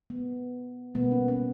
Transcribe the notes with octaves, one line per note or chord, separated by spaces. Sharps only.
B3
B2 G3 A#3 B3
C#4
B3